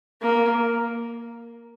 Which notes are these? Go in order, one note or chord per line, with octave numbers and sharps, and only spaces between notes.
A#3